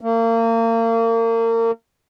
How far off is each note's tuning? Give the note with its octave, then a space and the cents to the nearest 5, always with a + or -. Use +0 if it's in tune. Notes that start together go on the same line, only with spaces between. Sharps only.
A#3 -35